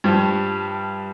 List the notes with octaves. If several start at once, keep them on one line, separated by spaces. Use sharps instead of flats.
G2 F3 G3